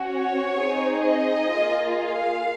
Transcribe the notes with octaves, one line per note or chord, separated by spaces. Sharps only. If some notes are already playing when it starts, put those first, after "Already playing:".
Already playing: C#4 F#4
C#5
C4 D#4 G#4
D#5
A#3 F4 G#4
F5